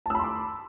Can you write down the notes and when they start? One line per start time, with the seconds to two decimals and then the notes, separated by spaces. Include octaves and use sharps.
0.06 A5
0.10 E6
0.15 B5
0.19 C6
0.24 D6